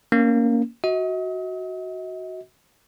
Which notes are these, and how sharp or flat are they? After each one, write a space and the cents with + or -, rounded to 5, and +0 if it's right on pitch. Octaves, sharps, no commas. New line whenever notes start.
A#3 +0 C#4 +15
F#4 +0 D#5 +40